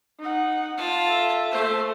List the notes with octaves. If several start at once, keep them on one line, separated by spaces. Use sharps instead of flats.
D#4 F#5
F4 A5
A4 E5
A3 C5